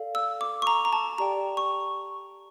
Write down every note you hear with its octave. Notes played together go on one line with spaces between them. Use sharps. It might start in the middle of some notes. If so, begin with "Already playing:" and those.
Already playing: A4 D5 F5
E6
D6
C#6
A#5
A#5
A5
G4 D5 G5 A#5
C#6